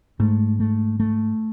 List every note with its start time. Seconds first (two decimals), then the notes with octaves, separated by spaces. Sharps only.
0.20 G#2 A3
0.60 A3
1.00 A3